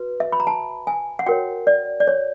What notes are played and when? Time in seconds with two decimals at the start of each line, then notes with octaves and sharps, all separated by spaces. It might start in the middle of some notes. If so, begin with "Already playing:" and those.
Already playing: F#4 B4
0.20 E5
0.32 B5
0.40 A#5
0.47 A5
0.87 G#5
1.19 F#5
1.26 F#4 A#4 C#5 G5
1.67 D5
2.00 D5
2.07 C#5